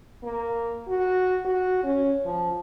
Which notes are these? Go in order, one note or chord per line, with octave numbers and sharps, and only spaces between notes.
A#3
F#4
F#4
C#4
F3